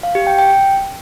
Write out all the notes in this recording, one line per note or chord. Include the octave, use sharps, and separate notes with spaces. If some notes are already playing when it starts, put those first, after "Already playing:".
F5
G4
G5
G5